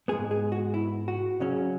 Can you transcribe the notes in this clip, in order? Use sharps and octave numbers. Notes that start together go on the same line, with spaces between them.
G#2 G#3 B3 G#4
G#4
F#4
E4
F#4
C#3 F#3 C#4